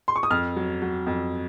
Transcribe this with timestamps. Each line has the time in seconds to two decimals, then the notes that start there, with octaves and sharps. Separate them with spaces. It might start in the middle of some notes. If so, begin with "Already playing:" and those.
0.08 C6
0.16 C#6
0.23 D#6
0.30 F2 F6
0.56 F#3
0.82 F#3
1.07 F2